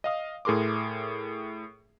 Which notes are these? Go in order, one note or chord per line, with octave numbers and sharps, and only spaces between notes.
D#5 F5 D#6
A2 G#4 A#4 C6 D6